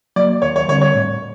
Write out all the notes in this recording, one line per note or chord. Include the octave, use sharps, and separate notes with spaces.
F#3 A#3 D5
D#2 C#5
C#5
D3 G3 C4 C#5
C#5
A2